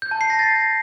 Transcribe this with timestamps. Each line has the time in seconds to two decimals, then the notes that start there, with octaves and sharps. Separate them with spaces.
0.02 G6
0.11 A5
0.21 C7
0.30 A#6
0.39 A6